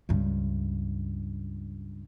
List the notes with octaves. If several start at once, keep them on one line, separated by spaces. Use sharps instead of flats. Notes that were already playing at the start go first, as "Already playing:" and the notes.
C#2 G2